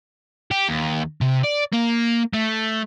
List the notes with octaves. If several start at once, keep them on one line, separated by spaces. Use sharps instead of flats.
G4
D#2
C3
D5
A#3
A3